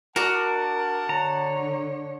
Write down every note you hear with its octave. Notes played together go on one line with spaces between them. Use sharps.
D4 F#4 A#4 F#5 A5
D3 C#5 A#5